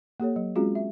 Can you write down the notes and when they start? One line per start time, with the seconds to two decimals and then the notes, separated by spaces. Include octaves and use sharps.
0.20 A#3 G4 A4 C#5
0.36 F#3
0.56 G#3 C4 C#4 F4 F#4 G#4
0.75 E5